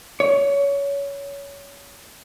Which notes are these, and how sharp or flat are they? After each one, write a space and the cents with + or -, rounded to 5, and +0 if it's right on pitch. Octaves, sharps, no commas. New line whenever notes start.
C#5 +20